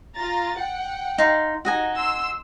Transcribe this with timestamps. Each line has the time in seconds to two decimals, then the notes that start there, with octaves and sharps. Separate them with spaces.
0.15 F4 A#5 A6
0.57 F#5 G5
1.18 D#4 F5 C6
1.65 D#4 F#4 D#5 G#5
1.96 C6 E6